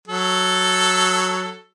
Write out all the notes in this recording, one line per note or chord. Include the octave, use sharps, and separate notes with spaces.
F#3 A4